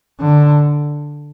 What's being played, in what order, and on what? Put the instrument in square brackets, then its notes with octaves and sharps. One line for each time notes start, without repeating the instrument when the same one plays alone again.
[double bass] D3